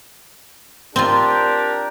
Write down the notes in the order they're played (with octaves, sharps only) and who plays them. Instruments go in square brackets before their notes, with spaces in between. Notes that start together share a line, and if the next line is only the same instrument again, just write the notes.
[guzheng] C4 F4 [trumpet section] D4 G4 A#4